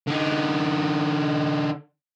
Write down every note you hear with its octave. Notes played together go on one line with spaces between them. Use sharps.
D3 D#4